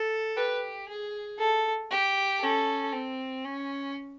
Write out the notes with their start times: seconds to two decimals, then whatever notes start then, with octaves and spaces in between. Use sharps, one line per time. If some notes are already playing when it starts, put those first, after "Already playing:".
Already playing: A4
0.36 G4 B4
0.88 G#4
1.39 A4
1.91 G4
2.41 C#4 A4
2.93 C4
3.45 C#4